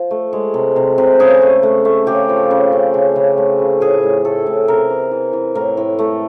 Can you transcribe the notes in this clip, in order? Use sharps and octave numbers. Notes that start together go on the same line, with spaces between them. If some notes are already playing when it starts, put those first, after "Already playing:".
Already playing: F3
A3
G#3
C3
C3
C3
C#3 G#4
A3
A3
A3
C#3 G4
F3
C#3
C#3
C#3
C#3
A3
C#3
A2 G#4
A2
A3 A4
A2
C3 A#4
E3
E3
E3
A2 A#4
A2
A3